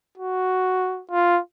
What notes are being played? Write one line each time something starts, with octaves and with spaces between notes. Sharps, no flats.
F#4
F4